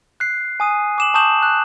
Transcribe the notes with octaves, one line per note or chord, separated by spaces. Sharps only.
F#6 C7
G#5 D#6 D#7
D6 E7 F#7
A5 C#6 D#6 G6 E7 F#7
F#6